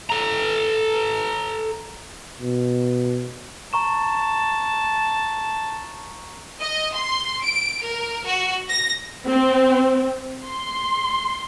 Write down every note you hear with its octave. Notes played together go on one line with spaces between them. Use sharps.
A4 A#5
B2
A5 A#5 C#6 E7
D#5
C6
D7
A#4
F#4
A#6
C4
C6